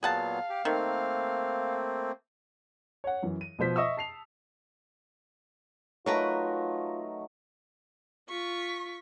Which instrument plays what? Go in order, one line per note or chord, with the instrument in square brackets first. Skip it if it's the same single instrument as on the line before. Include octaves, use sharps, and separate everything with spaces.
[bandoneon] A#2 F#3 B3 [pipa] G#4 F#5 A5 [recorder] F5
[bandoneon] G4
[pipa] D#3 [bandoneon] A3 A#3 C4
[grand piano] C#5 F#5
F#2 E3
D#7
B2 F3 C5 B6
D#5 E5 C#6 D#6 E6
A5 C7 F7
[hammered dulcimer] F#3 A3 D#4 [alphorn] F4 [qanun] A#4 B4 A#5 [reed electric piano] C#5
[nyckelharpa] F4 [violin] C#6 B6